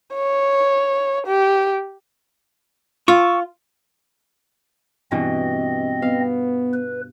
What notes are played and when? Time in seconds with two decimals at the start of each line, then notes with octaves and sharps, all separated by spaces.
0.15 C#5
1.26 G4
3.08 F4 C#6 E6
5.11 G2 B2 E3 C4 D#5
6.02 B3 F5
6.74 B4